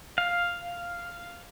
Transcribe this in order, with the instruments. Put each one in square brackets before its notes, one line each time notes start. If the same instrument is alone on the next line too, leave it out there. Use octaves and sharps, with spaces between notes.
[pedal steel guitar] F5